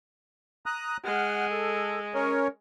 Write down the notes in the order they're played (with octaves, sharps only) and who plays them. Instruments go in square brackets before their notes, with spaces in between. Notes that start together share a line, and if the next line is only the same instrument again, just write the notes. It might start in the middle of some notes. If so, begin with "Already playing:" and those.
[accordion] A#5 D#6 F#6
[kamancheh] G#3 [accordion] F#5 F6
[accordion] A4
C#4 A#4 C#5